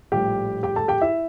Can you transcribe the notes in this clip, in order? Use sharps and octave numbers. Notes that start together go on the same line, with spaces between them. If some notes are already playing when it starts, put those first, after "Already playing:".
A#1 A2 G3 G4 G5
G4 G5
A4 A5
G4 G5
E4 E5